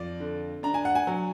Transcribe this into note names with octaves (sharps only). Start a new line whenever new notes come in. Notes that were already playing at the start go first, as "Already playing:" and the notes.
Already playing: F2 D5
D3
D4 A#5
G#5
F#5
G#5
F#3